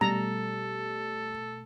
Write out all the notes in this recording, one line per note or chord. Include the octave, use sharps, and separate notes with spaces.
B2 G3 A3 A4 A#5